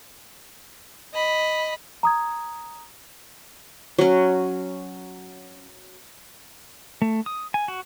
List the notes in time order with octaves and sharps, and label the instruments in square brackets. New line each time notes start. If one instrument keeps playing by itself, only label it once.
[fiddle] D#5 B5
[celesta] A#5 D#6 G#6
[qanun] F#3 C#4
[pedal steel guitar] A3
D#6
G#5
F#4